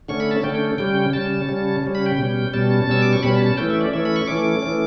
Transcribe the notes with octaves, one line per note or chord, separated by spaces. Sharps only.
D3 A3 C#4 C#6
B5
A5
D3 A3 C#4 G5
G5
C#3 G3 C#4 G5
C#3 G3 C#4 A5
C#3 G3 C#4
C#3 G3 C#4
B5
G5
B2 G3 C#4
B2 G3 C#4 A5
B2 G3 C#4 E6
D6
C#6
B2 G3 C#4 B5
A5
A5
E3 A3 C#4 G5
E5
D5
E3 A3 C#4 E5
B5
C#6
E3 A3 C#4 D6
E3 A3 C#4